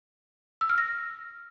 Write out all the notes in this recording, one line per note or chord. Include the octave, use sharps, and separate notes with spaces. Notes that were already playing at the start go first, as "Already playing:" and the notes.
E6
F6
A#6